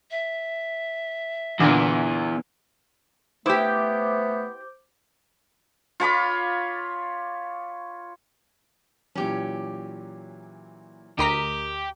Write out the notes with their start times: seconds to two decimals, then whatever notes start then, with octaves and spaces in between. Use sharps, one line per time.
0.11 E5
1.60 E2 A#2 D3 E3
3.46 A3 B3 E4 G4 C5 D6 G6
6.00 F4 C#5 B5 D6
9.15 A#2 E3 F#3 C#4 G4
11.19 D2 G4 A#4 D#5 A#5 B6